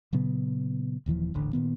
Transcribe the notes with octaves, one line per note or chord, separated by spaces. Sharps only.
A#2 C#3 F#3 B3
D#1 D#2 E3 F3
D#1 A1 D3
A#2 D#3 B3